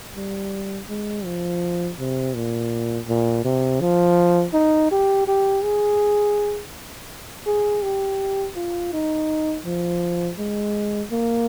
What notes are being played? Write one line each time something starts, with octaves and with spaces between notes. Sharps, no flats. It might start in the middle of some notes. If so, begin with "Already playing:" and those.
G3
G#3
F3
C3
A#2
A#2
C3
F3
D#4
G4
G4
G#4
G#4
G4
F4
D#4
F3
G#3
A#3